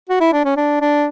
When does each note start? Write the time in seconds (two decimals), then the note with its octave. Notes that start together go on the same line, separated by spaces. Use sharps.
0.09 F#4
0.20 E4
0.33 D4
0.45 C#4
0.57 D4
0.81 D4